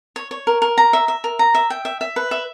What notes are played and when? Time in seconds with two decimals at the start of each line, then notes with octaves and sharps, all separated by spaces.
0.16 C#5
0.31 C#5
0.47 A#4
0.62 A#4
0.78 A#5
0.93 E5
1.08 E5
1.24 A#4
1.39 A#5
1.55 E5
1.70 G5
1.85 E5
2.01 E5
2.16 B4
2.31 E5